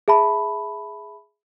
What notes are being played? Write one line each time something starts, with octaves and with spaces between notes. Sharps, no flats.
G#4 E5 A5 B5